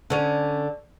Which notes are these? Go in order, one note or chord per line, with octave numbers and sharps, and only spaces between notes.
D3 C#4